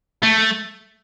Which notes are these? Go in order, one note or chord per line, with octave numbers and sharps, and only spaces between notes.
A3